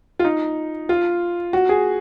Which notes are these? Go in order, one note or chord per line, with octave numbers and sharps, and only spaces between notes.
F4
D#4
F4
F#4
G#4